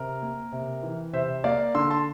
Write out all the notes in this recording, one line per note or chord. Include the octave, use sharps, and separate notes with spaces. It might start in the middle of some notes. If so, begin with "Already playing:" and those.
Already playing: C3 A#4
A#3
C3
E3
C3 C5 E5
A#3 D5 F5
D3 C6 E6
A5 C6